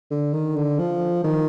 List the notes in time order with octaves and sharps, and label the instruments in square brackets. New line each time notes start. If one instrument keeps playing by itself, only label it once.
[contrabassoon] D3
D#3
D3
F3
D#3